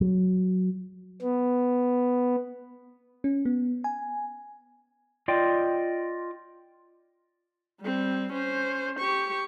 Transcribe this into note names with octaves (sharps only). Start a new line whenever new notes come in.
F#3
B3
C#4
B3
G#5
F4 D5 D#5 G5
G3 C4
C#4 C5
G4 C#6